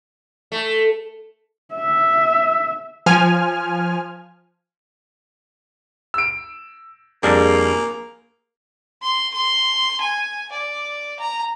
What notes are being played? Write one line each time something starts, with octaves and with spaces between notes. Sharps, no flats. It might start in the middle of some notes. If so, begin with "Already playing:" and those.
A3
E5
F3 G#5 F6
E6 D7
F2 G3 A#3 D4 G#4
C6
C6
G#5
D5
A#5